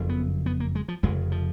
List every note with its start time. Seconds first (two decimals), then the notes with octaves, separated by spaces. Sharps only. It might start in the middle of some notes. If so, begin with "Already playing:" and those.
Already playing: F#1 F2 C#3
0.09 B3
0.46 B3
0.60 A#3
0.75 G#3
0.88 F3
1.03 F1 F2 C#3 G#3
1.32 F3